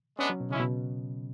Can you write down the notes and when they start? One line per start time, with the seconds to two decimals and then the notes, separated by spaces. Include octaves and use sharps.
0.19 G#3 B3 C#4 D4
0.29 F#3
0.40 B2
0.50 C#3 G#3 C#4 E4
0.60 B2